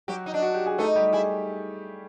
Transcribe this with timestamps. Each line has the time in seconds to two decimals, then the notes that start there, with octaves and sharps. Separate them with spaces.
0.08 F#3 F#4 G4
0.26 D#4
0.34 D4
0.42 F#4
0.54 G4
0.66 G#4
0.78 A3 D#4 A4
0.95 G3 G4
1.13 E4 G#4